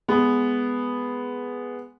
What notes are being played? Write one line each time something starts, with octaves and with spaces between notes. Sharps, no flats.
G#3 B3